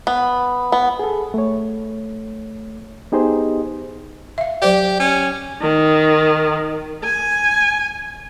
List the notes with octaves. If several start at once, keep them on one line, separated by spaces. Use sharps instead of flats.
B3
B3
G#4 A4
A3 C#5
B3 D#4 G4 G#4 C5 D#5
E5 F5
F#3 G4 C5 D5
C#4
D#3
G#5